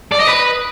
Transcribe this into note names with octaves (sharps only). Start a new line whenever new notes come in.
D5
D#5
B4